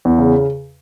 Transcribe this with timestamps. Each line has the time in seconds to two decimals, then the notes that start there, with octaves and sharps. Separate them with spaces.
0.05 E2
0.19 C#3